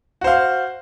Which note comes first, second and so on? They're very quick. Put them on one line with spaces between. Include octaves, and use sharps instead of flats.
F#4 C5 F5